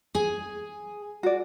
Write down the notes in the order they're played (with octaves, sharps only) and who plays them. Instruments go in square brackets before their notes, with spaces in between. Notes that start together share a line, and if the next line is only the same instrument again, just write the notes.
[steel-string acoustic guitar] G#4 G#5
[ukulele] F#4 D5